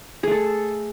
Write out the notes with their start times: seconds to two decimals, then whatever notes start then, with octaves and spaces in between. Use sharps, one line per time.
0.23 G#4
0.27 A3
0.31 A4